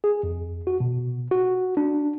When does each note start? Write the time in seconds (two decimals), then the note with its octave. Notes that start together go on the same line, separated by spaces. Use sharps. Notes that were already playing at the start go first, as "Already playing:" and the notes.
0.04 G#4
0.23 F2
0.67 F#4
0.80 B2
1.31 F#4
1.77 D4